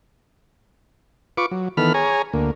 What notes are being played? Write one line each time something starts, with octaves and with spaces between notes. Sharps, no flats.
F4 B4 C#6 D6
F#3
D#3 E3 B3 A4 B5 F6
G#4 C#5 G#5 A#5
D2 A#3